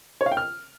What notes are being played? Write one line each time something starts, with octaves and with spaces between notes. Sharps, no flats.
C#5
F5
G5
F6